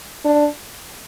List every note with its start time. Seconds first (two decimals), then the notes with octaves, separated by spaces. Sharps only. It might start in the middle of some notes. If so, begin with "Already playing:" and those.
0.25 D4